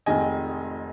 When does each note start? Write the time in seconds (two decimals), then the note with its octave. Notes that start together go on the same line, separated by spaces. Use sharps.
0.06 F1 F2 D#3 G#3 D#5 G#5